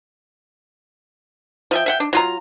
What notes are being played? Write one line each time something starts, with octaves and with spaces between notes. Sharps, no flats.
F3 E5 G5
E5 F#5 G5
D4
F#3 F4 A#5